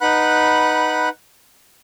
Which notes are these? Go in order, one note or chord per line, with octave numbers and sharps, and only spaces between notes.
D#4 B4 F#5 B5 F#6